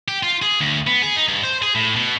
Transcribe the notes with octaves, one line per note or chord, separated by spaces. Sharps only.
G4
F4
G#4
D2
B3
G#4
D#4
G2
C5
G#4
A2
B2